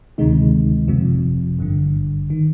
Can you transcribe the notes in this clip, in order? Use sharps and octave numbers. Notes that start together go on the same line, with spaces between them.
D2 C3 D#3 G#3 D#4
G1 F2 C3 F3
G#1 G2 D3
D#3